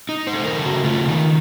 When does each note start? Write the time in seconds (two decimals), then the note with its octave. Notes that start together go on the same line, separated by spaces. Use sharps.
0.09 D#4
0.27 C5
0.34 A3
0.46 A#4
0.59 C#3
0.65 F#4
0.84 A3 F4
1.08 D#3 D#4